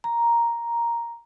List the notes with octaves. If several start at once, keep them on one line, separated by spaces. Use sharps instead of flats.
A#5